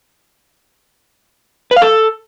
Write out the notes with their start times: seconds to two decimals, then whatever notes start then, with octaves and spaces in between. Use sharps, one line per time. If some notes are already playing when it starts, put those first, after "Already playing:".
1.71 B4
1.76 F5
1.82 A4